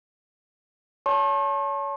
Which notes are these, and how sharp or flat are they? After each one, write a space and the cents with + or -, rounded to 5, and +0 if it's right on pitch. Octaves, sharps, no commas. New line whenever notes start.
C#5 +30 A5 -5 C#6 -45